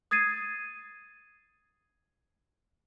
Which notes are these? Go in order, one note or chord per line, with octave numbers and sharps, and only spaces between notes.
D#6 G#6 A6 C7 D#7